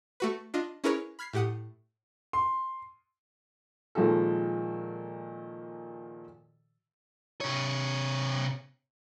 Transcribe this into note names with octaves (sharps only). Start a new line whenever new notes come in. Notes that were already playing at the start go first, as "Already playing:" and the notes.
A3 F#4 B4
D4 F4 D#5
C#4 E4 G#4 A#4 B4 C#5
B5 F6 G#6 B6 C7
A2 G4 F#5 D#6
C6
A#2 D#3 F3 G#3 F#4 A4
C3 C#5